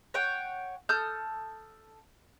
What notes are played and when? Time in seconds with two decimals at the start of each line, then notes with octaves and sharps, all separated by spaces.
0.14 C#5 F#5 G5
0.89 A4 D#6 F6 G6